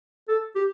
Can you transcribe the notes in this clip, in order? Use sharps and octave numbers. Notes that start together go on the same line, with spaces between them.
A4
G4